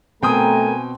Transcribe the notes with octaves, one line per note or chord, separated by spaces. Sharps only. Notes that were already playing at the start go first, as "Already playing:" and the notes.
B2 A3 C4 A#4 G5 G#5 A#5 D#6